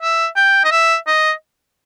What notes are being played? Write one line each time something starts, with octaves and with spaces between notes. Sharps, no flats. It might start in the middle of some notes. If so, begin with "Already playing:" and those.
E5
G5
D#5
E5
D#5